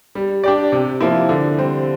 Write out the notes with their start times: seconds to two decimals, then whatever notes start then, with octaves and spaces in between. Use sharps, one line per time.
0.15 G3
0.44 D4 G4 D5
0.72 C3
1.01 F3 A#3 E4
1.29 D3
1.57 G3 C4